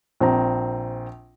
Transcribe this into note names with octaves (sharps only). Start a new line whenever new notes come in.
A#1 C4 A#5